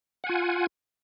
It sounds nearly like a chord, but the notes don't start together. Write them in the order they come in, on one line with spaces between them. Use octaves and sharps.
F#5 G#5 F4